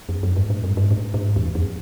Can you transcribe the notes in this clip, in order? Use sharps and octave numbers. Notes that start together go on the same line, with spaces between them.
F2
F#2
G#2
A2
G2
G#2
A2
A2
G#2
E2
F2